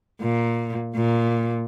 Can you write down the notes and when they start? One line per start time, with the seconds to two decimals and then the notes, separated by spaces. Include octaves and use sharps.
0.21 A#2
0.96 A#2